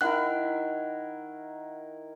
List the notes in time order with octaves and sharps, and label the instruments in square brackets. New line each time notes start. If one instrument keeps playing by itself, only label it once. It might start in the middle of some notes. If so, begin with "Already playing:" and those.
[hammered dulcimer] D#3 E4 A#4 [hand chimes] F#5 F#6